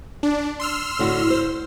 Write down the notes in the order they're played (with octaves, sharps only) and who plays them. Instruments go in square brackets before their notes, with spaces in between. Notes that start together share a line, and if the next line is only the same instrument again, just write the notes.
[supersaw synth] D4
C6 E6 F6
[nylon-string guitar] A2 D3 F#4
C5